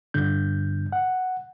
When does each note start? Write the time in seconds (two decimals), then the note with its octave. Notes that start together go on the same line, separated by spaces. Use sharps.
0.14 G2 D3 G6
0.92 F#5